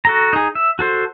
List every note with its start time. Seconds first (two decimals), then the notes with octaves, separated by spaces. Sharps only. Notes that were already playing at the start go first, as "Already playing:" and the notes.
0.05 F#4 A4 A#5
0.33 D#4 G#4
0.55 E5
0.79 F#4 A4 C5